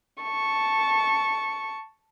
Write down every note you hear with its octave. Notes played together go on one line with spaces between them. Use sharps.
A5 C#6